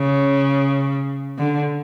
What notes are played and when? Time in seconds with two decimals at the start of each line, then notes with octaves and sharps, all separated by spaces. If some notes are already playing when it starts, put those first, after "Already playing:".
Already playing: C#3
1.38 D3